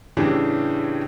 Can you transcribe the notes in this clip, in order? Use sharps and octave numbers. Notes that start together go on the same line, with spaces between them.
A2 C#3 E3 D4 G4